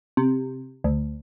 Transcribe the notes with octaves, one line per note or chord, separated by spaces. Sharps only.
C3
D2